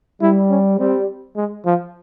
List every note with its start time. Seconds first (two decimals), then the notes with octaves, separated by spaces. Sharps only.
0.22 G3 E4
0.50 C#4
0.79 G3 C4
1.36 G#3
1.66 F3